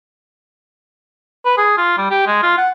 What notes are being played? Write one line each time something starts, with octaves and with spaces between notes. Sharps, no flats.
B4
G#4
F4
G3
G4
G#3
F4
F#5